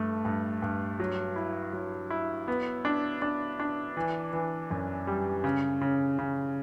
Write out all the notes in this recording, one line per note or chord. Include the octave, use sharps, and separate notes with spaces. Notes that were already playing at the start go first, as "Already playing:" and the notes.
Already playing: G2 A3
G2
G2
F#3
E4
F#3
E4
B3
D4
D4
D4
E3
E3
F#2
G3
C#3
C#3
C#3